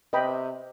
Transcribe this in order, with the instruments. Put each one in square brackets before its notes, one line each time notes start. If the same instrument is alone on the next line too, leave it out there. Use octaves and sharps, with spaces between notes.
[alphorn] C3 [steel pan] B4 D#5 G5 B5